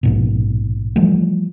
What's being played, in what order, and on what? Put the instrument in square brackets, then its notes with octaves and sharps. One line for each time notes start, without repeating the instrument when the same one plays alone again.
[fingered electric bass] A#1 G#2 B2
E3 F3 G3 A3